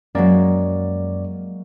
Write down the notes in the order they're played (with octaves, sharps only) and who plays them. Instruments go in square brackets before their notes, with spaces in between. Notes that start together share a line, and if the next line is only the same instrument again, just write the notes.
[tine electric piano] F#2 D5 [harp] F#3 G#3 A#3